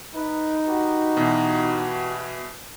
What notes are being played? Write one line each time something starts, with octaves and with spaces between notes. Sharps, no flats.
D#4 B4
F#4 G4 B4
B2 E3